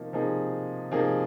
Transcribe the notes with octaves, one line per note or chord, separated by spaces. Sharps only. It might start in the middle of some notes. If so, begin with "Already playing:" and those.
Already playing: C3 F3 A#3 D#4
C3 F3 A#3 D#4 G#4
C3 F3 A#3 D#4 G#4